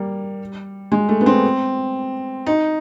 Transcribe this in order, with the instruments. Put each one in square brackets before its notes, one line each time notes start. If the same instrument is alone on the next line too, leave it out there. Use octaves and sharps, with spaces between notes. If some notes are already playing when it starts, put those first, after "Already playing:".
Already playing: [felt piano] G3 A#3
G#3
A3
B3
C4
D#4